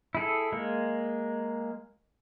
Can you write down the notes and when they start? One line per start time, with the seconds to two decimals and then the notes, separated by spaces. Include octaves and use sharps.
0.15 E4 G#4 A4
0.52 G#3 A#3